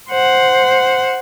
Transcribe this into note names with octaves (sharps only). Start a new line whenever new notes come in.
C5 F#5